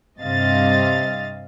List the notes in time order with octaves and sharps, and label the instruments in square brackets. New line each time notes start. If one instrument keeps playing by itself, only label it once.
[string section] G2 C3 D#5 F5 A6